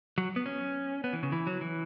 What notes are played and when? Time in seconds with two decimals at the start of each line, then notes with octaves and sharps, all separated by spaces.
0.18 F#3
0.36 B3
0.46 C#4
1.04 B3
1.13 E3
1.23 C#3
1.32 E3
1.47 F#3
1.61 E3